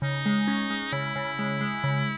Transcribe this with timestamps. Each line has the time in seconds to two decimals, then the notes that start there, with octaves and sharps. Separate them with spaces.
0.02 C#3 D#4
0.26 G#3
0.48 C#4
0.70 G#3
0.92 C#3 E4
1.16 C#3
1.39 G#3
1.61 G#3
1.84 C#3